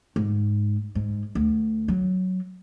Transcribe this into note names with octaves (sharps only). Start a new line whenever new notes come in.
G#2
G#2
D2
F#3